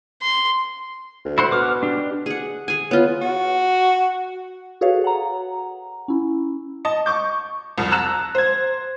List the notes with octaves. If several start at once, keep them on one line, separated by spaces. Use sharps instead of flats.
C6
D2
E4 C5 F#5
B2 F#5 D6 F6
D4 G4
G#4 F#5
G#4 G#5
B3 F4 C#5
F#4
F#4 G#4 A4 B4 C#5 F5
F#5 A#5
C#4 E4
D#5 A5
C#6 D6 G6
C2 F2
A5 A#5 E6 F#6 E7
C5 G#6